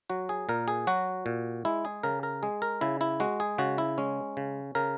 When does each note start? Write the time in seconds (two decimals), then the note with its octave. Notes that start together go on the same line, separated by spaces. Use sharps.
0.10 F#3 F#4
0.29 G#4
0.49 A#2 A#4
0.68 G#4
0.87 F#3 F#4
1.26 A#2
1.65 G#3 E4
1.85 G#4
2.03 C#3 A#4
2.23 A#4
2.43 G#3 G#4
2.62 A#4
2.81 C#3 E4
3.01 E4
3.20 G#3 F#4
3.40 G#4
3.58 C#3 F#4
3.78 E4
3.98 G#3 C#4
4.37 C#3
4.75 C#3 A#4